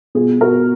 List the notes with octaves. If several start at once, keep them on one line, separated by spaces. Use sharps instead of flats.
B2 F4 G#4
B2 F#4 A#4